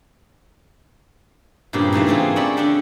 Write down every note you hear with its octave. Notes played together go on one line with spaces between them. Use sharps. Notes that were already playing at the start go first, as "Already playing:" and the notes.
G2 A#2 C#3 C4 G4
G#2 E3 A3 F5
A3 A#3 C4 F4 G#4
C#4 D5 E5 B5
D3 C#4 D4 G4